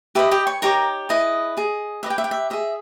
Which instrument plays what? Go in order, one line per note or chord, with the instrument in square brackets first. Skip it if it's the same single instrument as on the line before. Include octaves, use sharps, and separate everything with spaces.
[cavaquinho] G4 B4 D#5 E5
G4 G5
C#5 C#6
D#4 G4 A#4 C#5 A#5
E4 G#4 B4 D#5
G#4 D#5
G4 B4 D#5 E5
G5
E5
G5
E5
G#4 D#5 E5